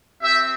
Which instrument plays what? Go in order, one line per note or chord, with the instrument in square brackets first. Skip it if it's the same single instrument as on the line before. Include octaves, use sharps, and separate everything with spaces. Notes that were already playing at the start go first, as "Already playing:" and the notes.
[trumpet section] C4 G4 E5